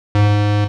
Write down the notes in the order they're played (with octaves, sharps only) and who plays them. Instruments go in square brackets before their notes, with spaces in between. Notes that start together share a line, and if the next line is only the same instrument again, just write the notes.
[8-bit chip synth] G#2